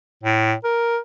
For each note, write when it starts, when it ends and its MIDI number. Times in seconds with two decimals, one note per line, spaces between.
0.23 0.53 45
0.64 0.98 70